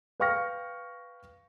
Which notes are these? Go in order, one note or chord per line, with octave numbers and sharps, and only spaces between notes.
B4 F5 G5 C#6 F6 A#6